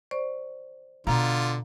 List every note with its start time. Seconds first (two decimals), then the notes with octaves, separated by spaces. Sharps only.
0.11 C5 D5 C#6
1.07 B2 D3 F4 F5 A#5